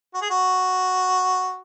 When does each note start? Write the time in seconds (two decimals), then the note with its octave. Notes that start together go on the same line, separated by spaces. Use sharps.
0.14 F#4
0.22 G#4
0.31 F#4